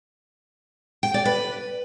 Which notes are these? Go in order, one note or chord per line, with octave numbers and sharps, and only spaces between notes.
G5
D5
B4